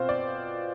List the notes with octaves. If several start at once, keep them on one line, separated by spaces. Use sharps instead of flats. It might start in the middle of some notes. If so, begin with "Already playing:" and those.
Already playing: B2 C4 F4 C5
D5